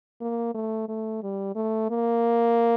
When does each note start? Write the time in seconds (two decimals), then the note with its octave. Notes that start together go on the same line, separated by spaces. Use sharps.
0.21 A#3
0.54 A3
0.89 A3
1.23 G3
1.55 A3
1.90 A#3